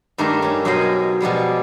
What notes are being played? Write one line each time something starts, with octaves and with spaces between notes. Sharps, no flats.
G2 D#3 A3 A#3 A#4 A#5
C#4 A#5
F#2 B2 C#4 G#4 C5 D#5
B2 F3 G3 G#3